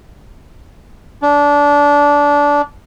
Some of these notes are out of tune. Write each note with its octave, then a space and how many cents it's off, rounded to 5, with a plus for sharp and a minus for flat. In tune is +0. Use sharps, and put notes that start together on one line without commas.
D4 -20